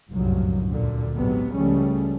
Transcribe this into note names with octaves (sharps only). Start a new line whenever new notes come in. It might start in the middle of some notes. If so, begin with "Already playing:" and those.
G1 C2 F#2 A2 F3 F#3
D2 A#2 D3
A1 G#2 C3 F#3 B3
C#2 C#3 F3 G3 A3 C#4